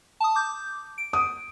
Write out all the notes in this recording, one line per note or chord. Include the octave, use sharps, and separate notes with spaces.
A5 D#6
D6 G6
D7
D#6